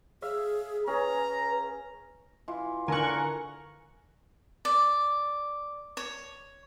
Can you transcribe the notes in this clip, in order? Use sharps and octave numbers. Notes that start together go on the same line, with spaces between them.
G#4 E5 F5
C#4 G#4 B4 A#5
E3 F4
D3 A#4 G#5 C#6 F#6
D5
C#5